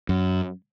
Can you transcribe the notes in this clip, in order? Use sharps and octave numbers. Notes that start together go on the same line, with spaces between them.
F#2